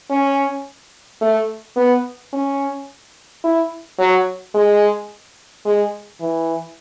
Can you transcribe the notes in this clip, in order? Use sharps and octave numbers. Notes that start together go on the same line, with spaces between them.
C#4
A3
B3
C#4
E4
F#3
G#3
G#3
E3